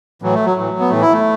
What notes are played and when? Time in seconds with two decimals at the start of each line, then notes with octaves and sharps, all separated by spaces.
0.22 A2 E3 F#3
0.34 A3
0.45 F#3
0.56 A2 E3
0.79 B3
0.90 A2 E3 A3
1.01 E4
1.13 A3